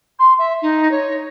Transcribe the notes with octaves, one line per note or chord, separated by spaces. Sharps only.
C6
E5
D#4
C#5